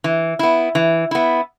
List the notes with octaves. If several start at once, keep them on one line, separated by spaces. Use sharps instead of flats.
E3
B3 E4
E3
B3 E4